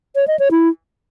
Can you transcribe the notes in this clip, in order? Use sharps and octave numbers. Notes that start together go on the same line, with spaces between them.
C#5
D#5
C#5
E4